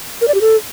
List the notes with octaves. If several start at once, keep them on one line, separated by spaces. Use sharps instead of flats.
A#4
D5
G4
A4